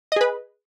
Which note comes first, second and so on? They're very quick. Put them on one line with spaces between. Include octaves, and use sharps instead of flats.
D#5 G#4 B4